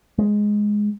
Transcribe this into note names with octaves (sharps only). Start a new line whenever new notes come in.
G#3